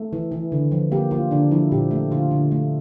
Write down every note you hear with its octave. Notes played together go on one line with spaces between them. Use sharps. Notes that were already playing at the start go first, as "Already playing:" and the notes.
Already playing: A3
E3
E3
D3
F3
A#3 G4
A#3 F4
D3 D4
F3 E4
A#2 G4
A3
D3 F4
D3
A3